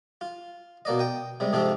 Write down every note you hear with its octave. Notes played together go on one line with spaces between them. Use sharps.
F4
B2 A#3 D5 D#5
G5 D#6
C3 G3 G#3
F2 G#2 C3 F3 C4 F4